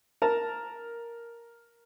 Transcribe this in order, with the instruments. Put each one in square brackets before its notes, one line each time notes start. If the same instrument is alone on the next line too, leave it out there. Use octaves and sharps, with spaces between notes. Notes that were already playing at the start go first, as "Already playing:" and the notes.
[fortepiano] A#4 A5